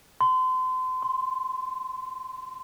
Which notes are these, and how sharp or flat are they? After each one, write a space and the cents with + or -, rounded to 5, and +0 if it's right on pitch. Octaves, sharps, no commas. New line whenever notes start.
C6 -35
C6 +5